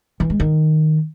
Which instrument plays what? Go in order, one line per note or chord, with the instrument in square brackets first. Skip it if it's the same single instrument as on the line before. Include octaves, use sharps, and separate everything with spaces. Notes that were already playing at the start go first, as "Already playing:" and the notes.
[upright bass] E3
G#3
D#3